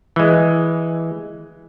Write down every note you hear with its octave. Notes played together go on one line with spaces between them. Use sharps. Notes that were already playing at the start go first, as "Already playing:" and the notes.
E3 G#3